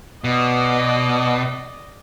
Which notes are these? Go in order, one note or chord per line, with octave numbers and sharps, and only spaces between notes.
B2 D5 D#5